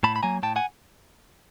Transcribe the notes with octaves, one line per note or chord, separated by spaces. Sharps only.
A2 A5 B5
B5
F#3 A#3 G#5 A#5
A2 G5 A5
F#5 G#5